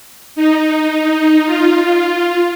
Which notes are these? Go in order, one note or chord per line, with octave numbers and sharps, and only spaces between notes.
D#4
F4